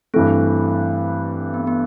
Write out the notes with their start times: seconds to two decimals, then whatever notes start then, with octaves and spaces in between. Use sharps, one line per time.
0.14 G2 E3 A3 C4
1.54 B3
1.67 B3